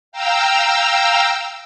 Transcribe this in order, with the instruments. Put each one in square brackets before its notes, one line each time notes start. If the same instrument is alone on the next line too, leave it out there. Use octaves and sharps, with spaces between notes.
[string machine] F5 G5 A#5 E6